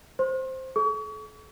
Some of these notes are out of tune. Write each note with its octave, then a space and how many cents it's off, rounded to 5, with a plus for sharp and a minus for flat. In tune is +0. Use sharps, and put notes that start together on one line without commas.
C5 +0 C6 +40
A4 -40 C#6 +40